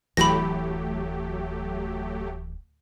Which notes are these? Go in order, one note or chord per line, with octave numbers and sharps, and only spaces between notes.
D1 E3 F#3 A3 G4 B5 A#6